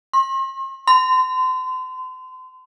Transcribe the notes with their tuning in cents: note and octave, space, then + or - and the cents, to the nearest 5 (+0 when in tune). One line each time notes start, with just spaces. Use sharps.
C6 +45
C6 -35